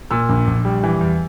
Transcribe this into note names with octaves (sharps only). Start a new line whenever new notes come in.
A#2 E6
A#1
A#1
G3
E3
E2